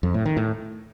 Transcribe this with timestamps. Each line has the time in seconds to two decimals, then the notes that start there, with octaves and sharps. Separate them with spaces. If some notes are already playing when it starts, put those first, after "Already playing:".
0.03 F2
0.14 A2
0.26 D#3
0.37 A2